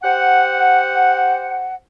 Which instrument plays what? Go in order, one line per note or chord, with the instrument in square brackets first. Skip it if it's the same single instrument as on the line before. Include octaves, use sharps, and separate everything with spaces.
[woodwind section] G4 C5 F#5